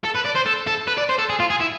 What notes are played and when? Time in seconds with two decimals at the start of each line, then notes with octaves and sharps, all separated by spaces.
0.04 A4
0.15 B4
0.25 D5
0.35 C5
0.46 A4
0.67 A4
0.87 B4
0.98 D5
1.09 C5
1.18 A4
1.29 G#4
1.40 F4
1.50 G#4
1.61 E4